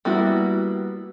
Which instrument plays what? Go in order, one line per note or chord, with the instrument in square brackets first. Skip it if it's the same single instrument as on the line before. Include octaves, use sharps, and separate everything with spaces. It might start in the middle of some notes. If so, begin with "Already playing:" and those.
[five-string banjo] G3 A#3 B3 E4 F#4